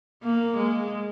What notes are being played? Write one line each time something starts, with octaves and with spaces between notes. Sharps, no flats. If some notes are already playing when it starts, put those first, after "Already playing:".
A#3
G#3